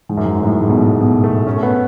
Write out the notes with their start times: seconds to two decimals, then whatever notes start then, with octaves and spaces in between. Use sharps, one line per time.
0.09 G#2
0.17 F#2
0.25 G#2
0.43 A2
0.61 G#2
0.70 B2
0.78 A2
1.01 B2
1.24 A3
1.47 C#4
1.56 A3
1.63 B3